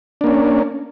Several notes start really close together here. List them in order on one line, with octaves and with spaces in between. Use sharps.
D4 A#3 C#4